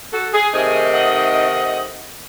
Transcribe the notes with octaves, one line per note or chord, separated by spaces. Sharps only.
F#4 A4
G#4
C3 D#3 A3 D#4 G#4
D#5 F#5